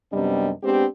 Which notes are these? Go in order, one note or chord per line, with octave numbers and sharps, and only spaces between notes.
F#2 C3 G3 B3 D4 D#5
G#3 B3 C4 D4 G4